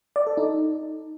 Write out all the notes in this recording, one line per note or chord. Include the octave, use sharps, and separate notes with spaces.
D5
A4
D#4